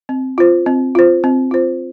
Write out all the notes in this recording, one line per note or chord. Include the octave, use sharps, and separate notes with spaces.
C4
F4 C5
C4
F4 C5
C4
F4 C5